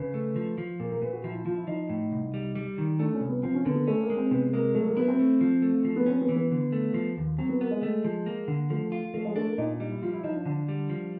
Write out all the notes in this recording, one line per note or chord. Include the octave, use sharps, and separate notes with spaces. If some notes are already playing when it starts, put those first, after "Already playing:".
Already playing: C#3 B4
A3
F3
F3
A#2 A#4
A#4
A#2 B4
F#4
F3 E4
E4
F3 F4
E4
F3 D#4
A2
C2
G3
G3
D#3
A3 D4
C#4
C2
B3
F3 C4
C#4
D3 B3
B3
A3 C#4
A#3
G#3
C4
C3 B3
G#3 A#3
F#3 A3
A#3
B3 E4
C4
A3
F3
A3
F3
B3
C4 C#4
B3
E3
B3
D3
A3
F3
D#2
F#3 C4
B3
A#3 B3
G#3
A3
F3
A#3
D3
F3 A3
F4
F3 A3
G#3
A3 D4
A#3
A#2 D#4
D4
G3 D#4
E4
F3 F4
E4
F3 D#4
D4
D3 D4
G3
F3